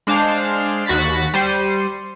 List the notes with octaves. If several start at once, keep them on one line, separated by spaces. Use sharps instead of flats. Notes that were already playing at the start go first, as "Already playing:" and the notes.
G#3 D4 C5 F5
D#2 F#4 B5 A6 B6
G3 C5 C7 C#7 D#7